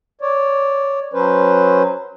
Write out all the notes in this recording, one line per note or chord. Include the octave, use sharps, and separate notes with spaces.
C#5 D5
F#3 C#4 B4 C5